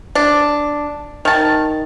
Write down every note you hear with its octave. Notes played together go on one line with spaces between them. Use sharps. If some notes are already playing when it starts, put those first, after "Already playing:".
D4
D#3 A5